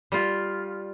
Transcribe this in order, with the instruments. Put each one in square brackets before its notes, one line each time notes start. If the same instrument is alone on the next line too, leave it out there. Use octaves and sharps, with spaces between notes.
[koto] G3 F4